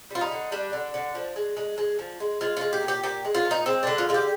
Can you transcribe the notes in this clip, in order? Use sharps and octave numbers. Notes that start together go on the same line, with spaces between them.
G3 F4
D#4
D3
G3 D4
D3
D3
F3
G#3
G#3
G#3
F3
G#3
G#3 F4
G#3 F4
G4
A#2
G4
A#2 G4
G#3
F4
A#2
D#4
G#3 C4
D3 D4
F4
G#3 F4
G4